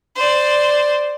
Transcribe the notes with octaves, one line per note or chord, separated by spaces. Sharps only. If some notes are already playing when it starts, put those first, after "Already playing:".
C5 D5